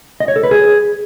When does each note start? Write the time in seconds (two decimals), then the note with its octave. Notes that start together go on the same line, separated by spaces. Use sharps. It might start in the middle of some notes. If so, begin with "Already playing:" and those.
0.20 D#5
0.28 C#5
0.36 A4
0.43 B4
0.51 G#4